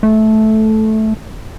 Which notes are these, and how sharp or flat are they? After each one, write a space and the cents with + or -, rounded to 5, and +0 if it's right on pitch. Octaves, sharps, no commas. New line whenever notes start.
A3 -10